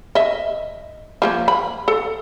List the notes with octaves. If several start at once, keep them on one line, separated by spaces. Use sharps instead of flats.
D#5 E5
F3 G#3 A#3
B5
A4